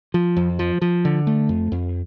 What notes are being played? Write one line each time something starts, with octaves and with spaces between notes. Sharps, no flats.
F3
F2
F3
F3
D3
A3
F2
F2